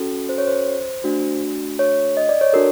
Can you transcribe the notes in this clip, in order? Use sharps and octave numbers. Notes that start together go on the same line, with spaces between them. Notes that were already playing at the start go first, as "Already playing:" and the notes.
Already playing: C#4 F#4 A4
C5
C#5
C5
A3 D4 F#4
C#5
D#5
D5
C#5
D4 F#4 A4 A#4